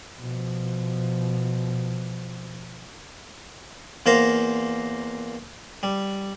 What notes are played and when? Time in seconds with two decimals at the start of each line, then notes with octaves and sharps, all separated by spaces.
0.19 B2 F3
4.06 E2 A#3 C5 F5 A#5
5.83 G3